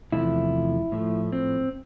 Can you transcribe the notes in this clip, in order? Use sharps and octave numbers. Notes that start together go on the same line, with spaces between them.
E2 C3 F3 A3 E4
A2 F3 A3
C4